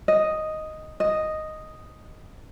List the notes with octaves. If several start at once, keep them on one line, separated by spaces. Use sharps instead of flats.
D#5
D#5